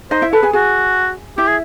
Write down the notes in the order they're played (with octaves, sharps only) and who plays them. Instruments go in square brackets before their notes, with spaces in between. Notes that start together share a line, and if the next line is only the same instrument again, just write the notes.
[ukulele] D#4 D#5 [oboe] C5
[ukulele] E4 E5
[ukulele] A4 A5 [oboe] B4
[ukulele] G#4 G#5
[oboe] F#4 [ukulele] G#4 G#5
[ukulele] E4 E5 [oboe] G4
[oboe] G#4